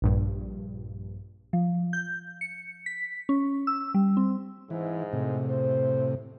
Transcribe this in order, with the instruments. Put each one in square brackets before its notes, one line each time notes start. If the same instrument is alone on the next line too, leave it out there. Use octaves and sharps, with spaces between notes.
[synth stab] A#1 G2
[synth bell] F3
G6
C#7
B6
C#4
E6
G3
C4
[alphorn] G#2 [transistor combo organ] E3
[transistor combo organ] A2 C3
[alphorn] C5